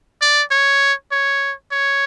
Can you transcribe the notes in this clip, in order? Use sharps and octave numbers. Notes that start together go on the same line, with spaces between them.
D5
C#5
C#5
C#5